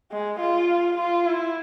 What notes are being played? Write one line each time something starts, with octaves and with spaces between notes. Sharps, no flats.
G#3
F4
F4
E4